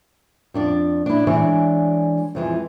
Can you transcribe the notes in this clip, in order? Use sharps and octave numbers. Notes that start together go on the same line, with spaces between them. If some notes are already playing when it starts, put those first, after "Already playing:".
F2 D4 D5
D4 E4
E3 G#3 D4 C#5 D5 E5
F2 E3 G#3